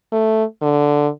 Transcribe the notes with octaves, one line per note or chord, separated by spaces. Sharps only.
A3
D3